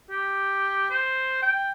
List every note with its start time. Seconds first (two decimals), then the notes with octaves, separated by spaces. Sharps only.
0.09 G4
0.90 C5
1.42 G5